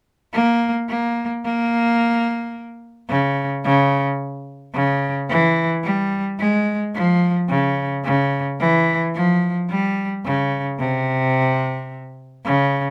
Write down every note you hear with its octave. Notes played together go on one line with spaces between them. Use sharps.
A#3
A#3
A#3
C#3
C#3
C#3
E3
G3
G#3
F3
C#3
C#3
E3
F3
G3
C#3
C3
C#3